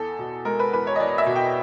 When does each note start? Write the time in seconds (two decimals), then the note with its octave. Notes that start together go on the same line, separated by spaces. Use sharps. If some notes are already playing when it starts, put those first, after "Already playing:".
Already playing: E2 A4
0.19 B2
0.45 G#3 A#4
0.59 B4
0.73 E2 B4
0.87 C#5
0.95 D#5
1.00 E2 D5
1.18 E5
1.27 B2
1.36 G5